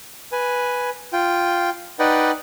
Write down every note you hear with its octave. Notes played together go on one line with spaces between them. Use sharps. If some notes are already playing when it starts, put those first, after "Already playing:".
B4 G#5
F4 G5
D#4 B4 D5 D#5 F#5 G5